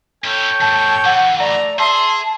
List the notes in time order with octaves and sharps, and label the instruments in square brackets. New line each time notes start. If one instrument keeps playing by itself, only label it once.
[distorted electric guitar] C#4 E4 [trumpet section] A4 C#5 G5
[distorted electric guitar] D#2 G#2 [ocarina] A5
[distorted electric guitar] D3 E3 [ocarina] F#5
[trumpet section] A3 A#5 [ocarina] D5
[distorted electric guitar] G#4 [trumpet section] E5 C6 [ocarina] A5